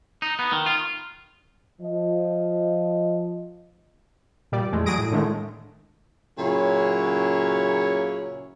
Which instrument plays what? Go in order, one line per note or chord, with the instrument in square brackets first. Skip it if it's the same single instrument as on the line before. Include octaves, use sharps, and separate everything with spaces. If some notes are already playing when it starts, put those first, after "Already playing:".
[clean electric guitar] D#4
B3
D#3
F4
[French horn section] F3 D#5
[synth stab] A#2 G3 D5
E2 G#3 A3
F#3 G3 G#4 D#6 A#6 D7
A2
A2 D3 D#3 G#3 A3
[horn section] A#2 C#3 F#3 C#4 E4 C#5